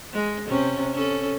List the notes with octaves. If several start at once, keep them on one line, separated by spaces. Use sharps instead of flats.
G#3
C3 C#4
C#4 A4